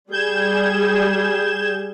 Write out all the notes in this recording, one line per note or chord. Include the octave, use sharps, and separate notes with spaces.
G3 G#4 G6 G#6 E7